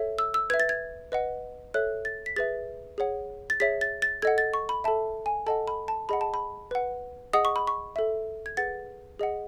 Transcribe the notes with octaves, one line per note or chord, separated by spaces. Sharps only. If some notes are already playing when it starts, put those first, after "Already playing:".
Already playing: A4 C#5 E5
E6
E6
B4 E5 G#6
A6
G#6
B4 D#5 F#5
A4 C#5 E5 F#6
A6
B6
G#4 B4 E5 A6
G#4 C#5 F#5
A6
G#4 C#5 E5 B6
A6
A6
A4 D#5 F#5 G#6
A6
C#6
B5
A4 E5 A5
G#5
A4 D#5 F#5 A5
B5
A5
G#4 D#5 F#5 B5
A5
B5
B4 F#5
G#4 D#5 F#5 D#6
C#6
B5
C#6
A4 E5
G#6
G#4 B4 F#5 A6
G#4 D#5 F#5